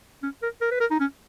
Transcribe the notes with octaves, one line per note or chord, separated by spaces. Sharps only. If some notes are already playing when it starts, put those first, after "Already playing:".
C#4
A#4
A#4
B4
A#4
D#4
C#4